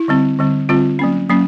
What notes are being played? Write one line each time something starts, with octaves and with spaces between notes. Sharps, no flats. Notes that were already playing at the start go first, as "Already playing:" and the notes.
Already playing: E4
D3 G3 C4
D3 G3 C4
D3 G3 C4 F4
F#3 A#3 C#4
F#3 A#3 C#4